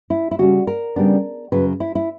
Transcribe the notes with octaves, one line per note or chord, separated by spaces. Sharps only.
E4
E4
C#3 G3 C#4 F#4
A#4
C#3 G3 B3 D4
F#2 C#3 F#3 B4
E4
E4